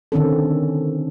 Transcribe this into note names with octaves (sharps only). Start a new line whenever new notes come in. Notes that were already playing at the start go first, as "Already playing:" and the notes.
D3 D#3 C4 C#4 A4